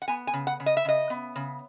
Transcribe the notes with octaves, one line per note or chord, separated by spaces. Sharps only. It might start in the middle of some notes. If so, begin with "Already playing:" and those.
F#5
B3 G#5
G#5
C#3
F#5
C#3
D#5
E5
C#3 D#5
B3
C#3